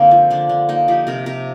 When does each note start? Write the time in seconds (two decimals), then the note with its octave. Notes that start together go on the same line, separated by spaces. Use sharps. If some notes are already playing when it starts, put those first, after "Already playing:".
Already playing: D3 A#3 C4 D#4 F4
0.11 F3
0.30 D3 D4
0.49 D3
0.69 A#3 D#4
0.88 F3 G4
1.07 C3 A#4
1.26 C3 A#4